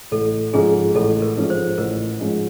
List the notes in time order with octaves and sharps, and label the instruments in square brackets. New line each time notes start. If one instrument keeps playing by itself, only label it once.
[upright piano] A1 [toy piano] A4
[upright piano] G#2 F3 G#3 C#4 [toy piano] G#4
[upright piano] A1 [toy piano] A4
[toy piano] A#4
[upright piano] G#2 F3 G#3 C#4
[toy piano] C5
[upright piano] A1 [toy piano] A#4
[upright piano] G#2 F3 G#3 C#4